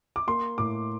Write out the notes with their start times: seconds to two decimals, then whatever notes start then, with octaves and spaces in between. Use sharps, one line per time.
0.16 D6
0.27 A#3 C6
0.58 A2 D6